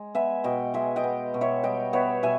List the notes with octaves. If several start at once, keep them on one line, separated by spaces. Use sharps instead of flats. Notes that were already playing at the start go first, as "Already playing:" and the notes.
Already playing: G#3
B3 E5 G#5
B2 D#5 G5
G#3 E5 G#5
D#5 G5
B3
B2
C#5 E5
G3 D#5 G5
B3 C#5 E5
B2 E5 G#5